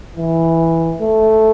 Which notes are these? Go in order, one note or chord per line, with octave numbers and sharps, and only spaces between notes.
E3
A3